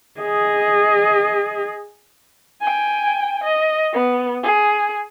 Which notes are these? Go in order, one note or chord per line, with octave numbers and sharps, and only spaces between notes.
G#4 D#5
G5 G#5
D#5
B3
G#4